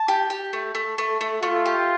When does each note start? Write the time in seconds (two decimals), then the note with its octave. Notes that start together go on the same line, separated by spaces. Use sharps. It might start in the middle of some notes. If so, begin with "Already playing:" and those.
Already playing: A5
0.08 G4
0.30 G4
0.53 A3
0.75 A3
0.98 A3
1.21 A3
1.42 A3 F4
1.66 G4